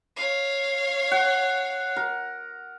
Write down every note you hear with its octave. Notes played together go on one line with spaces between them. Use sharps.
C#5 F5
F#5
A#4